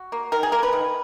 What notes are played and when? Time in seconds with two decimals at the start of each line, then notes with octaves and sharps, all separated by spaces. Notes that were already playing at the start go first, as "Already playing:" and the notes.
Already playing: F#4
0.12 A#3
0.32 D#3 A#4
0.43 G#4
0.52 A#3 A#4
0.63 B4
0.73 D#3